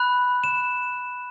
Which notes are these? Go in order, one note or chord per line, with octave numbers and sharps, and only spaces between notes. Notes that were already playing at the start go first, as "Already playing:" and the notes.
Already playing: B5 F#6
E7